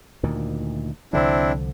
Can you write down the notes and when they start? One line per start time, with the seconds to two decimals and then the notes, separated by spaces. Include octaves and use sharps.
0.23 D2 A#2 D#3
1.13 C2 D3 F3 C4 D4 E4